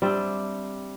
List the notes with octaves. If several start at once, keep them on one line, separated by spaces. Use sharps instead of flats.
G3 C4 D4 E5